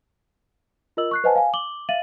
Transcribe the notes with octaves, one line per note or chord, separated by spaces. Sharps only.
F4 A#4 D#5 E6 F#7
C#6 F#6 C7
B4 C5 D#5 F#5 G#5 A5
F5 G#5
D6 F#7 G7
E5 F5 A6 D#7 F#7